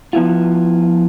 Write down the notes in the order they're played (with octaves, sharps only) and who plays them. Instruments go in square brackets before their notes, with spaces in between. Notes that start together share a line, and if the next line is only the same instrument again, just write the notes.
[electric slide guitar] F3 B3 E4 F4